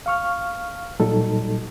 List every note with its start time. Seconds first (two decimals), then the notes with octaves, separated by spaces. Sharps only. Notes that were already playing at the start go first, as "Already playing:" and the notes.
0.06 F5 C#6 F6
1.00 A#2 F#3 G3 D#4 A4